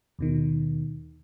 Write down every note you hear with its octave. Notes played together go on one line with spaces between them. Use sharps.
D#2 B2 D#3